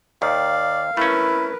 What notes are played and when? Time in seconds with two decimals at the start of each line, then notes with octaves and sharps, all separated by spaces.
0.22 D#2 D#3 D5 F5
0.97 A3 C#4 E4 A#4 B4